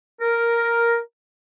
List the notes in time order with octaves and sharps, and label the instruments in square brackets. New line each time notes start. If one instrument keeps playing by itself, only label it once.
[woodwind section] A#4